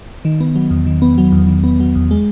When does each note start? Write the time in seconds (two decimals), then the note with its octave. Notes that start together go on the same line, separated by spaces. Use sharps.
0.25 D#3
0.40 B3
0.56 F#3
0.70 E2
0.87 D#3
1.02 B3
1.18 F#3
1.32 E2
1.48 D#3
1.64 B3
1.80 F#3
1.95 E2
2.11 G#3